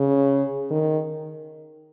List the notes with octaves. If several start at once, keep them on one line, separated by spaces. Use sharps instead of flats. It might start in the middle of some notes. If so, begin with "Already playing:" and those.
Already playing: C#3
D#3